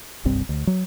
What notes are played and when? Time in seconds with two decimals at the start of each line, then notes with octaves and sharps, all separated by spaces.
0.25 F#1 C2 G2 C4
0.49 D2
0.67 F#3